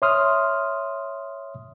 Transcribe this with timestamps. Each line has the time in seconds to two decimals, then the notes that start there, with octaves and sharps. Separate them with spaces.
0.02 C#5 E5 C6 D#6 F6